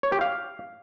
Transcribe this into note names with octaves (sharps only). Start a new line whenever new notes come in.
C#5
G4
F5